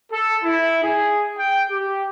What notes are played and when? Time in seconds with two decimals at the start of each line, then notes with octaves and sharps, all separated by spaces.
0.11 A4
0.43 E4
0.82 G#4
1.37 G5
1.70 G4